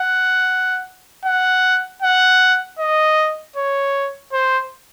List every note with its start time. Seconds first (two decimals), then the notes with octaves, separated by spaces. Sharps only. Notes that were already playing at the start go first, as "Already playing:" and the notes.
Already playing: F#5
1.26 F#5
2.02 F#5
2.79 D#5
3.56 C#5
4.33 C5